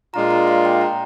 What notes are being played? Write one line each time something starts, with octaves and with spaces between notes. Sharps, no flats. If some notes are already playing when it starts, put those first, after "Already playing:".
A#2 G#3 D4 F4 A#5
A#5
F5
G5
A#5